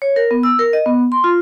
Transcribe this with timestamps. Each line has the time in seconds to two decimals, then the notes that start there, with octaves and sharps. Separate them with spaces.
0.02 C#5
0.16 A#4
0.31 B3
0.43 E6
0.59 A#4
0.73 D#5
0.86 B3
1.12 C6
1.24 F4